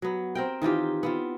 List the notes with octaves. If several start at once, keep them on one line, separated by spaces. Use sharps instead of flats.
F#3 B3
C4 A#4 G5
D#3 E3 F4 G4
B3 C4 F4